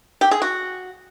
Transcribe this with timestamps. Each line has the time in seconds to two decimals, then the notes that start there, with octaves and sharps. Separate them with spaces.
0.21 G4
0.31 G#4
0.42 F#4